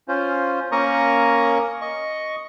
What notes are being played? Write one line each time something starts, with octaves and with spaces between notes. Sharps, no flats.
C#4 F4 C5
A#3 C#4 A#4 A#5 C#6 D#6
D#5 C#6